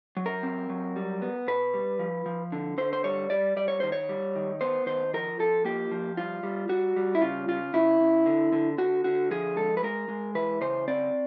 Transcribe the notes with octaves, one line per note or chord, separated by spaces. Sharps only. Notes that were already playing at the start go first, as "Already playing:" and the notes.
F#3
A#4
C4
F#3
G3
B3
B2 B4
G3
F3
F3
D3
D3 C5
C5
G3 C#5
G3 D5
G3 D5
C#5
D#3 C5
C#5
G3
D#3
B3 C5
D#3 C5
F3 A#4
F3 A4
A#3 G4
F3
G3 F4
G3
G3 F#4
G3
E4
C#3 F4
C#3 F4
C#3 E4
C#3
D3
D3
D3 F#4
D3 F#4
F3 G#4
G#3 A4
B4
G#3 A#4
G#3
E3 B4
C#3 C5
C4 D5